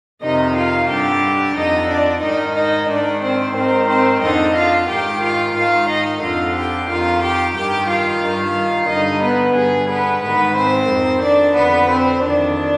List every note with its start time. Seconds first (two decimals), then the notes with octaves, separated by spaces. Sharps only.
0.22 F2 C3 D#3 D#4 D#5
0.56 F4 F5
0.89 G2 D3 G4 G5
1.56 F2 D3 D#4 D#5
1.90 D4 D5
2.23 G#2 D#3 D#4 D#5
2.56 D#4 D#5
2.89 G#2 D#3 D4 D5
3.23 C4 C5
3.56 G#2 D#3 C4 C5
3.89 C4 C5
4.23 F2 D3 D#4 D#5
4.56 F4 F5
4.89 G#2 D#3 G4 G5
5.23 F4 F5
5.56 G#2 D#3 F4 F5
5.89 D#4 D#5
6.22 F2 D3 F4 F5
6.56 G4 G5
6.89 F2 D#3 F4 F5
7.23 G4 G5
7.56 G2 D#3 G4 G5
7.89 F4 F5
8.23 G2 D#3
8.89 G2 D3 D#4 D#5
9.23 B3 B4
9.55 G2 D3 G#4
9.89 B3 B4
10.23 G#2 D#3 B3 B4
10.56 C4 C5
10.89 F2 D#3
11.23 D4 D5
11.56 F2 D3 B3 B4
11.89 C4 C5
12.22 F2 D#3 D4 D5